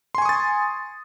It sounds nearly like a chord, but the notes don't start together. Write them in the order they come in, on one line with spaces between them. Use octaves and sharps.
C6 G#5 C#6 D#6 A6